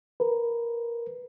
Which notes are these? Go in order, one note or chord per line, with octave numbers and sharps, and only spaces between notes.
A#4 B4